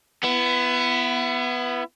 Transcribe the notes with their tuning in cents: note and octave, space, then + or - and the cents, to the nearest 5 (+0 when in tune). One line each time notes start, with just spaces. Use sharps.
B3 +5 E4 +30